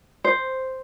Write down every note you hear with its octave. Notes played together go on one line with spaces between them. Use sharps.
C5